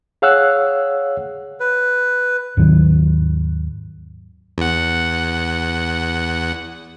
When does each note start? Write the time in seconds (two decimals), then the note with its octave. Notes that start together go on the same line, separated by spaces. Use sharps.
0.22 G#4 C#5 F5 F#5 E6 F#6
1.60 B4
2.57 D#2 G#2 D#3 F#3
4.58 E2 F#5